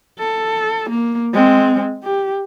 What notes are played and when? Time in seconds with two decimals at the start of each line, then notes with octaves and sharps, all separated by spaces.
0.19 A4
0.90 A#3
1.33 G#3 C4
2.03 G4